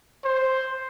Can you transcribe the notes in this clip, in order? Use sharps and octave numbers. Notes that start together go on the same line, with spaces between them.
C5